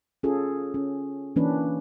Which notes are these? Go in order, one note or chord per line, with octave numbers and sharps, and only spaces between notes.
C#4 F4 G#4 A4
C#4
E3 A#3 C#4 D4 B4